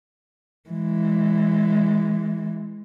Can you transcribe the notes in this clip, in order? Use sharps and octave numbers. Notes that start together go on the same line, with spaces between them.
E3 G#3